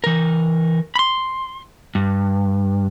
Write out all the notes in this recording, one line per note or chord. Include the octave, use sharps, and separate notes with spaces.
E3 A#4
B5 C6
G2